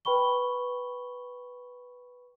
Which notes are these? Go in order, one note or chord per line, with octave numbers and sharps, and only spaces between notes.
B4 G5 B5 C#6 G7